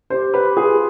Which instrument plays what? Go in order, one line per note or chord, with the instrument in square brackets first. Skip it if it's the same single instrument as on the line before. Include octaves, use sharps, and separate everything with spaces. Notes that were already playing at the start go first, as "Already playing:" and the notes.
[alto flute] G4 [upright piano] C5
[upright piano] B4
[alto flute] F4 [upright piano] G#4